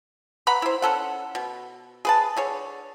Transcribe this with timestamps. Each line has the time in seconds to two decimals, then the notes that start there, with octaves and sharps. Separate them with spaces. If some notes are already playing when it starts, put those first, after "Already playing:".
0.47 B4 F#5 A#5 B5
0.62 E4 C5
0.82 C#4 A4 F#5
1.35 B2
2.05 G#4 B4 A5
2.36 D3 G#4 C#5